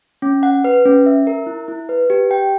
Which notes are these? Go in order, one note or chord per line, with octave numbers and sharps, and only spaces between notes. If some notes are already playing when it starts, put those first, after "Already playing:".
C#4
F#5
B4
C#4
E5
A#4
E4
E4
B4
G4
G5